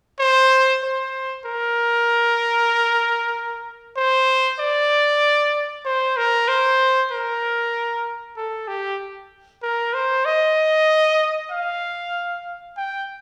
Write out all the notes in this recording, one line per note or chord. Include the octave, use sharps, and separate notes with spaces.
C5
C5
A#4
C5
D5
C5
A#4
C5
A#4
A4
G4
A#4
C5
D#5
F5
G5